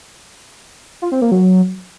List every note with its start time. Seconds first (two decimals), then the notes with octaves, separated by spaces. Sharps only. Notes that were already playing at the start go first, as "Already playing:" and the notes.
1.02 F4
1.12 C4
1.22 A#3
1.32 F#3